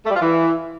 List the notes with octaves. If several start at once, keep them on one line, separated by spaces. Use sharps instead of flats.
A3
G3
F4
E3